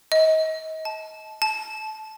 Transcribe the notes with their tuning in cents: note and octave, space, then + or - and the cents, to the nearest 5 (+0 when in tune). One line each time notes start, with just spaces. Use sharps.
D#5 +30
A5 -20
A5 -20